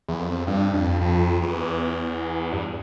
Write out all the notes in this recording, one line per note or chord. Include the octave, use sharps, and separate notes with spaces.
E2
F2
G2
F2
F2
E2
G2